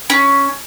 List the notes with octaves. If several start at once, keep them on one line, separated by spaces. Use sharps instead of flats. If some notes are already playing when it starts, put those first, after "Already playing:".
C#4